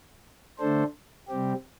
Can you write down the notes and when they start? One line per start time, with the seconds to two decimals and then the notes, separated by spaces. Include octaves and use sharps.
0.59 D3 A3 D4 A4 C5
1.29 C3 G3 C4 G4